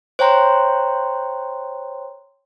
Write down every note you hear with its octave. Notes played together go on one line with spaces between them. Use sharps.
C5 C#5 G5 A#5 C6